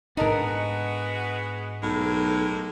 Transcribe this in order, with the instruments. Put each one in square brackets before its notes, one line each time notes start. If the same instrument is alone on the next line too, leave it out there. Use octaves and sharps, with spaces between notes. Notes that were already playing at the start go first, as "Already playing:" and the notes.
[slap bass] G#2 D4 [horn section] G#3 B3 F#4 [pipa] D#4 A4 A#4
[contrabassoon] B1 [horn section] A2 G#3 A#3